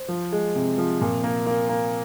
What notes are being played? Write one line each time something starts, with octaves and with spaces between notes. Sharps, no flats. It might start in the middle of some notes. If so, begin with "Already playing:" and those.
Already playing: C5
F3
G#3
C3
F3
A#2
A#3
A#3
A#3